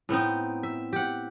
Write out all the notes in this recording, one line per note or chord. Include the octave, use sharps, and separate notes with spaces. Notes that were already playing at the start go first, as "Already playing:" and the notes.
A2 B3 C4 D#4
E5
G4 F#5